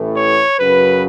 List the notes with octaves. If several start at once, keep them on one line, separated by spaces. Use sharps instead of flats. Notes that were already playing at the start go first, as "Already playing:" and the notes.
Already playing: A1 A2 E3 A3
C#5
F#2 C#3 F#3 B4